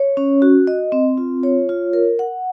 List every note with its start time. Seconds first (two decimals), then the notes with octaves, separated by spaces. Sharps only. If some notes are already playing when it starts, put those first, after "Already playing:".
Already playing: C#5
0.17 C#4
0.42 F#4
0.67 D#5
0.92 C4
1.18 F4
1.43 C#5
1.69 F4
1.93 A#4
2.19 F#5